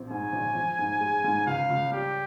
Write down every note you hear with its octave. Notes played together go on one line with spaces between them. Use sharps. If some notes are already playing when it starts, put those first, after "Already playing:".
Already playing: A#1 C4
G#2 G#5
A#1
F3
G#2
G#3
G#2
C#2 F5
C#2
G3 G4